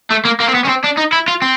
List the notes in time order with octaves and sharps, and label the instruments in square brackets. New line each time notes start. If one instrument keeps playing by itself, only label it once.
[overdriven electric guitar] A3
A#3
A#3
C4
B3
C#4
C4
D4
D#4
E4
F4
C4